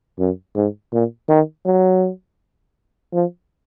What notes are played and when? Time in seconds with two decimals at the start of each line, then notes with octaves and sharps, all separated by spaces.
0.19 F#2
0.55 G#2
0.93 A#2
1.29 D#3
1.66 F#3
3.13 F3